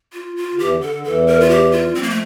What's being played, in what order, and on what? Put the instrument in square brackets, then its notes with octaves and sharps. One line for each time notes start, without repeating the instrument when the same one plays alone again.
[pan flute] F4
F4
[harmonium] D3
[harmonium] E2 E3 [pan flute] G4
[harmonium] D3
[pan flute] A4
[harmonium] D3
[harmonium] E2 E3 [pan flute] A4
[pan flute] A#4
F4
G4
F4
[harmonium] G3
[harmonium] F2 F3 [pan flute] C4
[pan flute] A#3
A3